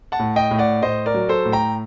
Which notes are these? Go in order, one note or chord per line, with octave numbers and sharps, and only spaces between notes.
F#5 A5
A2
D#5 G5
A2
D5 F#5
A2 C5 D#5
A#4 D5
F#3
A4 C5
A2
G5 A#5